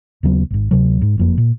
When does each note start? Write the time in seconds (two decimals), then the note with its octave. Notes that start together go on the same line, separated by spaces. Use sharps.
0.23 D#2 C#3 F#3 B3
0.51 G#1 G#2
0.71 D2 C3 F#3
1.02 G#2
1.18 F#1 F2 A#3
1.38 A#2